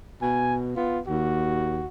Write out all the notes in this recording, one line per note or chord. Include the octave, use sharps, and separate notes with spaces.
B2 G#5
B3 F4
D#2 F#4